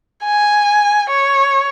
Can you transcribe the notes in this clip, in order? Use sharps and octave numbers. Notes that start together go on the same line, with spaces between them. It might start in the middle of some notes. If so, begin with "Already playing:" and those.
G#5
C#5